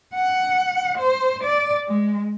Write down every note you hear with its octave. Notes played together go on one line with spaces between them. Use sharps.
F#5
C5
D5
G#3